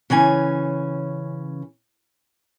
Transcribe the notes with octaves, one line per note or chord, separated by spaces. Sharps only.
C#3 E3 C#4 G#5